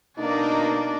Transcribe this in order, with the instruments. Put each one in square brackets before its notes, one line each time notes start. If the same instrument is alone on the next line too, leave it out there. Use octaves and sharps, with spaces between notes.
[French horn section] B2 A#3 D#4 [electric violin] D4 D5